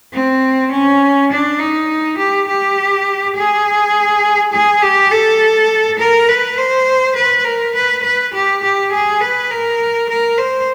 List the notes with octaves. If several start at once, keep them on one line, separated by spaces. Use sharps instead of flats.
C4
C#4
D4
D#4
G4
G4
G#4
G#4
G4
A4
A#4
B4
C5
B4
A#4
B4
B4
G4
G4
G#4
B4
A#4
A#4
C5